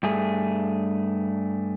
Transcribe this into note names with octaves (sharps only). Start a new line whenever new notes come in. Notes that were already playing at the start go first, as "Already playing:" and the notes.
G2 A3 G#4